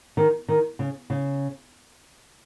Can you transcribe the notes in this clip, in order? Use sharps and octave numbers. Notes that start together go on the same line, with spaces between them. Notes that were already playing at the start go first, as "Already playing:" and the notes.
D#3
D#3
C#3
C#3